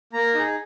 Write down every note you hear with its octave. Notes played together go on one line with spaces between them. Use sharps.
A#3 A#5
D#4 G#4